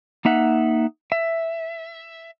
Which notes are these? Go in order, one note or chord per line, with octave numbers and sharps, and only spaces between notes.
A#3 D#4 E5 F#5
E5